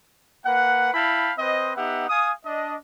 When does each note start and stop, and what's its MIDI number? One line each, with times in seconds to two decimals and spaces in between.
0.45 0.91 58
0.45 0.91 71
0.45 0.91 78
0.94 1.31 64
0.94 1.31 77
0.94 1.31 79
0.94 1.31 81
0.94 1.31 83
1.38 1.75 60
1.38 1.75 71
1.38 1.75 72
1.38 1.75 75
1.75 2.07 59
1.75 2.07 63
1.75 2.07 67
1.75 2.07 76
1.75 2.07 78
2.08 2.31 77
2.08 2.31 80
2.08 2.31 87
2.45 2.75 62
2.45 2.75 75